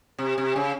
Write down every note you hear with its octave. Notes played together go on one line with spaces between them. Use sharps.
C3
C3
C#3